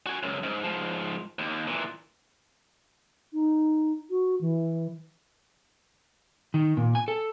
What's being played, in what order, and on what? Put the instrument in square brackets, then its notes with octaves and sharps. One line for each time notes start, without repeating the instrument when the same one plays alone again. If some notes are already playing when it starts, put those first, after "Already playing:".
[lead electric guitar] F#4 G#5
C#2 F#2
G#2
G#2 F3
D#2
A#2 E3
[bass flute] D#4
F#4
E3
[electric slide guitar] D#3
A#2
G#5
A4